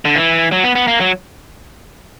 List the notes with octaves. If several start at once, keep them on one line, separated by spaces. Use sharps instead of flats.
D3
E3
F#3
B3
B3
A#3
F#3